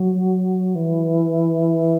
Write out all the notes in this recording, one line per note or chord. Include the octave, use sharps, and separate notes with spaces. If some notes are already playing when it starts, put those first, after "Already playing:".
Already playing: F#3
E3